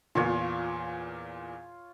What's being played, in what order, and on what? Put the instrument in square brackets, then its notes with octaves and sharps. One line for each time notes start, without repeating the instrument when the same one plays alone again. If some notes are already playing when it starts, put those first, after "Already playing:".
[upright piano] E2 A#2 [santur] F4 C#5